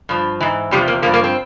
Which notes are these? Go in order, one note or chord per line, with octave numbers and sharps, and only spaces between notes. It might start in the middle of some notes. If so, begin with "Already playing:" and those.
G2 F3
G#2 E3
E2 C3 F3 G3
A#3
G2 F3 A#3
A#3
C4